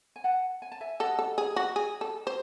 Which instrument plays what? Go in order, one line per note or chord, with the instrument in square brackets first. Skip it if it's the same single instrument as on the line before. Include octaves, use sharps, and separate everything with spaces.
[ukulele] G#5
F#5 A5
G#5
A5
E5 G#5
[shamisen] A4 [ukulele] D#5 F#5
[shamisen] A4
G#4
F#4
G#4
A4
C5